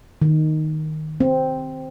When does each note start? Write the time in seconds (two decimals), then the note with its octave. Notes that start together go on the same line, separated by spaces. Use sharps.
0.22 D#3
1.20 C4